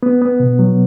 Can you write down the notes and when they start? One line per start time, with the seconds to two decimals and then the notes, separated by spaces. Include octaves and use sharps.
0.03 B3
0.22 B3
0.40 B2
0.59 F#3